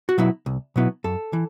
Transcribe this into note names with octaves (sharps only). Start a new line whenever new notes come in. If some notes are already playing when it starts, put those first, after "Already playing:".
F#4
B2 F#3 B3 E4
C2
B2 F#3 B3 E4
F#2 A4
E3